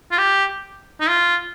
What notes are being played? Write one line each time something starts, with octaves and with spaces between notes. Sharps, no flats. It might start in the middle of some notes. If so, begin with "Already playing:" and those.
F4
G4
D#4
F4